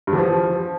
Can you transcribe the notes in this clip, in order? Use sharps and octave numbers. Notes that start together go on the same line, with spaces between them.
G2
E2
F3